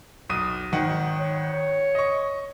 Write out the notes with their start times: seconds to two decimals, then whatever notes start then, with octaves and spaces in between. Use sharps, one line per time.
0.29 B1 D#6 D#7
0.72 G#1 D#3 F#5
1.19 C#5
1.95 D#5 C#6